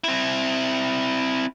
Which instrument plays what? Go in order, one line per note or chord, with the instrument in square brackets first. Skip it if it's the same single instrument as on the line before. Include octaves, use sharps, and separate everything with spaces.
[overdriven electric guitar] C4 E4